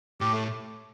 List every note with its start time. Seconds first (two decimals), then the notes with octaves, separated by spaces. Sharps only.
0.21 A2 G4
0.32 A3